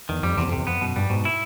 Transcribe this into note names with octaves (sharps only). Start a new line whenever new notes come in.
E2 D#3
F2 G3
E2 C3
F2
E2 C3
F2 B3
F#2 B2
G2 G3
G#2 B2
E4